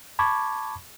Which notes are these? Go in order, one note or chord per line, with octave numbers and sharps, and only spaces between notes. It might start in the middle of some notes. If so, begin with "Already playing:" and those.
A5 B5 C#6 D6 G#6